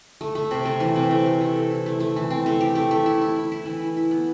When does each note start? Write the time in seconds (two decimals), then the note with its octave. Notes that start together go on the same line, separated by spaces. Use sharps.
0.21 A3
0.35 A3
0.51 C3
0.65 A3
0.80 E3
0.96 C3
1.11 A3
1.26 A3
1.41 A3
1.56 A4
1.71 E4
1.86 A3
2.00 A3
2.16 E3
2.30 C4
2.46 A3
2.61 G4
2.75 A3
2.91 A3
3.06 E4
3.22 E4
3.36 E4
3.52 E4
3.66 E3
3.81 E4
3.97 E4
4.11 B3